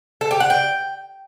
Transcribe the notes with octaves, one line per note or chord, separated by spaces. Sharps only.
A4
G4
F#5
G5